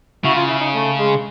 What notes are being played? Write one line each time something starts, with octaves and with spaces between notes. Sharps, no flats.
C#3 E4 F#4
F4
E4
D#4
A3
G#3